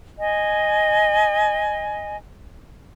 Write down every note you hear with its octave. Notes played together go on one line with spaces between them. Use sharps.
D#5 G#5